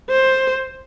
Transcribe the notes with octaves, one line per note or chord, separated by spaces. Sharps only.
C5